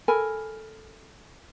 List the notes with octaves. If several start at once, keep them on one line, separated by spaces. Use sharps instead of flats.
A4 A#4 G#5 B5